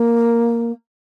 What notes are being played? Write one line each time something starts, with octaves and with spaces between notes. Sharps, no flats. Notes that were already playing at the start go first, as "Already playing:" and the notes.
Already playing: A#3